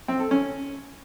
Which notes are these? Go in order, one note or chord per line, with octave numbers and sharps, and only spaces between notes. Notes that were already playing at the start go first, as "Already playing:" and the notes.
C4
A4
C#4